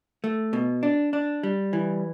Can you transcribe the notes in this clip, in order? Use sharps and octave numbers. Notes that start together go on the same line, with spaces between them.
A3
B2
D4
D4
G3
E3